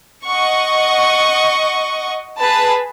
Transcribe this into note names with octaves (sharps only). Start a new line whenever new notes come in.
D#5 F#5 C#6
G#4 B4 A5